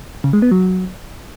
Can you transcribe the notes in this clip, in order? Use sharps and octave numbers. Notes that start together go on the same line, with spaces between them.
C#3
G#3
B3
F#3